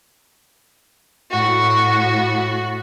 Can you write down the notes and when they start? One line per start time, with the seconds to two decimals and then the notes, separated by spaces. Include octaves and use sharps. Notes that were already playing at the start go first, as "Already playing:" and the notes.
1.31 A2 F#4